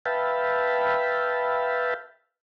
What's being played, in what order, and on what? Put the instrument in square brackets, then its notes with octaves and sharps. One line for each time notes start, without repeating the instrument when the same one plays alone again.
[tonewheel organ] B4 E5 F5 G5 A5 B5